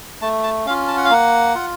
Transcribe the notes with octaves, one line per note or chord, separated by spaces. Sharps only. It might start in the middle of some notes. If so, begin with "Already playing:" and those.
A3 A5
A5
C#4 F4 F5
A5
F#5
F5
A#3 F#5
F4